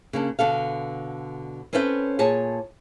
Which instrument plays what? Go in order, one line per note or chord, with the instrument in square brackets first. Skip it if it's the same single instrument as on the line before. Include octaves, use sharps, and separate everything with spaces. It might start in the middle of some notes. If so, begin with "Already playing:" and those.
[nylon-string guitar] C#3 A#3 D4
B2 D3 A4 F5
C4 C#4 A4 B4 D#5 G5
A#2 G#4 C#5 A5